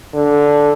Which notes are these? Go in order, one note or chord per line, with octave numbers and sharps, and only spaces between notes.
D3